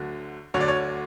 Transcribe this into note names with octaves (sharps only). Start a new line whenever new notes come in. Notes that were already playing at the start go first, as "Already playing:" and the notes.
Already playing: D2 D3 F#3
D2 D3 F#3 C#5
D5
C#5